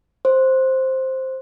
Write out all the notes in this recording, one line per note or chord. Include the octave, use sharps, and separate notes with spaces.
C5